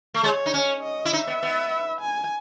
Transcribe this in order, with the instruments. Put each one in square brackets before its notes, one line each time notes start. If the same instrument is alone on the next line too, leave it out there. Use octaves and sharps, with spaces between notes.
[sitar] A3
[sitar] G#3 [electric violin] C#5
[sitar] D#4
C#4
[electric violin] D#5
[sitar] E4
[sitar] D#4 [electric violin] E5
[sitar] B3
B3
[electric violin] G#5